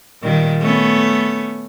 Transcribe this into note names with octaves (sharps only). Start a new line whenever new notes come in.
A#2 D#3 G3
A3 B3 C#4